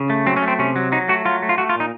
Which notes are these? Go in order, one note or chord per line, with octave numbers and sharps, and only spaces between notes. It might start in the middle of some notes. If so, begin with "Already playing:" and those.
Already playing: C#3
A3
F#3 C4
C#4
A3
C4
C3 C#4
F#3
F#3 D#4
A3 F#4
F#3 F4
A3
F4
A3 F#4
F4
A#2 D#4